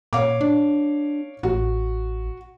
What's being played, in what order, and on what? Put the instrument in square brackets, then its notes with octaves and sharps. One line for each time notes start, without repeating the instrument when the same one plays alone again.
[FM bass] A#2 [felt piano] C#5 F5 D6
[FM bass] D4
[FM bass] A1 [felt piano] F#4